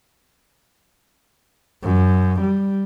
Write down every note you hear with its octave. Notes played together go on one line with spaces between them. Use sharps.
F#2
G3